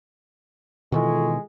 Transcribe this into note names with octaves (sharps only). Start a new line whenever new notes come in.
B2 D#3 E3 G#3 F4 A4 C#6